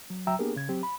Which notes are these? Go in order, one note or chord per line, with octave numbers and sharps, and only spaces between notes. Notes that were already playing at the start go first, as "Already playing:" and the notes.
F#3
D2 F#3 E5 G5 A#5 E6
A#3 B3 D4 G4 G#4 A#4
C#3 G#6
F#3 C4 G4
B5